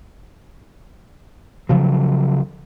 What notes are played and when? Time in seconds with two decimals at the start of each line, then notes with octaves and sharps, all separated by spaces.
1.69 C#3 F3 F#3